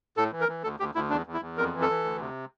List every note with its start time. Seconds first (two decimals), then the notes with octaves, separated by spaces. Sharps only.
0.17 A2 A4
0.32 E3
0.41 A#4
0.48 E3
0.63 D2 A4
0.80 D2 G4
0.95 D2 E4
1.10 E2 D4
1.26 E2
1.34 E4
1.41 E2
1.57 F2 A#4
1.73 E3
1.82 A4
1.89 E3
2.04 D2
2.20 C3